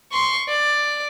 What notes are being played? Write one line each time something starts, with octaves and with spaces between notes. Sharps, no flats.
C6 C#6
D5